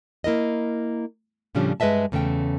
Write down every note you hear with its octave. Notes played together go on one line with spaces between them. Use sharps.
A#3 E4 A#4 D#5
A2 C#3 F3 G3 C#4 D4
G2 G#3 B4 D#5 E5 A5
E2 C#3 A3 C#4 G5